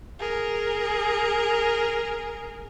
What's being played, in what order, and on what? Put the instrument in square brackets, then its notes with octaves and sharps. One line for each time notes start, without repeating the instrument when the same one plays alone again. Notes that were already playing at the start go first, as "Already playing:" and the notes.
[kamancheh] G#4 A#4